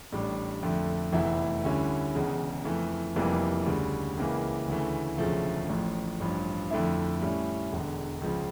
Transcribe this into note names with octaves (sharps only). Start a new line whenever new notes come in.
A1 A2 G3 D4
F2 D3 A3
F1 E2 E3 A3 E4
D2 D3 G3 C#4 E4
E1 E2 C#3
F2 E3 A3
F1 F2 E3 G3 A#3
D2 C#3 G3
C#2 C#3 E3 A#3
D2 C#3 E3 A3
E1 D2 C#3 F3 A3
A1 A2 F3
A1 G2 F3
F2 D3 A3 E4
A2 G3 C#4 E4
E1 E2 D3
C#2 C#3 F3